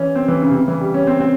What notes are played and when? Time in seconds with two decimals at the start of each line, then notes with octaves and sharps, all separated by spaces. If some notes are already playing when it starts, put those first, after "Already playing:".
Already playing: E3 C#4
0.15 C4
0.28 E3
0.42 C#3
0.49 C3
0.55 C#3
0.68 E3
0.81 G3
0.94 C#4
1.07 C4
1.20 C4